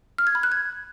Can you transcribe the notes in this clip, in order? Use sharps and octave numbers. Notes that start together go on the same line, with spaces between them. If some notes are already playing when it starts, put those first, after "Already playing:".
F6
G#6
B5
F#6
G#6